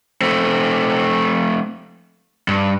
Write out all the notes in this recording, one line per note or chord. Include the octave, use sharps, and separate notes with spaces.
A3 C4
G2